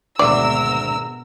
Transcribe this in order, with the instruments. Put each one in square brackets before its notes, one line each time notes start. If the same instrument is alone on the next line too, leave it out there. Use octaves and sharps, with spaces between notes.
[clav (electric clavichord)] G#1 D2 [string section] B2 A#4 E6 [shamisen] D5